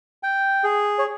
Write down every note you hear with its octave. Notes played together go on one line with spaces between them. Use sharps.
G5
G#4
C#5